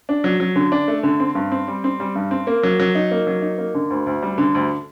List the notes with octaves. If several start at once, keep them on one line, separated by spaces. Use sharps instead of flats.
D4
F#3
F#3
D3
D4
A3
D3
C4
G2
C4
G3
C4
G3
G2
C4
A#3
F#3
F#3
D#4
A#3
F#3
D#4
A#3
D3
D2
D2
G3
D3
D2